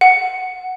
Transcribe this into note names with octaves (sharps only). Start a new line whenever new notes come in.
F#5